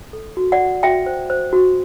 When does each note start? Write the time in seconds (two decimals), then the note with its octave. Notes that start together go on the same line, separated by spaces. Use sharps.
0.13 A4
0.37 F#4
0.52 D5 F#5
0.60 F#4
0.83 F#4 E5 G5
1.06 C5
1.30 C5
1.53 F#4